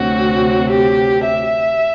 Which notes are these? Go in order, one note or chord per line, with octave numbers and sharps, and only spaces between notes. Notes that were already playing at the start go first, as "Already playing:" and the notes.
Already playing: D2 C3 F#3 C4 F#4
G4
E5